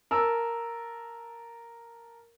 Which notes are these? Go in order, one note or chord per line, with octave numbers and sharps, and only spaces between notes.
A#4 A5 E6